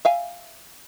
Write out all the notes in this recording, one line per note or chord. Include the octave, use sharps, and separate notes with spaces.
E5 F5 G#5